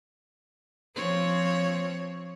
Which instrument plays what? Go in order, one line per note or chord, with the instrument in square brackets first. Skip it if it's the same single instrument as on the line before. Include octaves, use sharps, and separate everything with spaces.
[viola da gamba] F3 C4 C#5